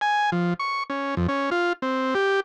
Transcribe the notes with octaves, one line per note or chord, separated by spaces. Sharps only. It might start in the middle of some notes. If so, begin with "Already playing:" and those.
G#5
F3
C#6
C#4
F2
C#4
F4
C4
G4